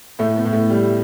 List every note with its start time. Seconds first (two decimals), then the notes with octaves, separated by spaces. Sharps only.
0.19 A2 A3
0.36 B3
0.45 A2
0.53 A3
0.70 G3